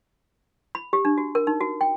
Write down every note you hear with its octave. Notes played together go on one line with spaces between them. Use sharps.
B5
G4
D4
F#4
A#4
D#4
F#4
G5